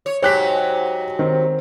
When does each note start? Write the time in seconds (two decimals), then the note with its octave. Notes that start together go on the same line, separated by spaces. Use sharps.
0.06 C#5
0.22 G#2 F#3 G4 C#5 F#6 B6
1.19 D#3 C4